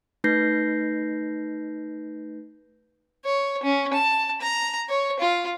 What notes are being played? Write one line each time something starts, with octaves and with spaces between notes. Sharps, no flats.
A3 D#4 B4 G6 A#6 C7
C#5
C#4
A5
A#5
C#5
F4